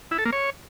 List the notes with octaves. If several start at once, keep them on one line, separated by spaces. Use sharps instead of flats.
E4
A4
A#3
C#5